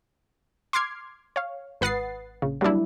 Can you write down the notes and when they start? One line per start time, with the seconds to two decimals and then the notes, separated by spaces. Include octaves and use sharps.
0.73 C6 D6 F6 G#6 C7
1.36 C#5 F5
1.81 G#1 B4 F#5 D#6 A6 C7
2.42 A#1 C#3
2.61 F#3 G3 A#3 D4 E4